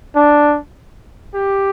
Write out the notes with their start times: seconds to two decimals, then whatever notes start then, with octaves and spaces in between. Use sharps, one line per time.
0.15 D4
1.34 G4